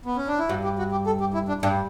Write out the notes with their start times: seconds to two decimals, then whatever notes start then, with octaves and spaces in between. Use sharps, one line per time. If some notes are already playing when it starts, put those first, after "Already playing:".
0.05 B3
0.17 C#4
0.28 D4
0.39 E4
0.49 G2 F#4
0.64 G4
0.78 F#4
0.92 G4
1.06 A4
1.20 G4
1.34 E4
1.48 D4
1.62 G2 D4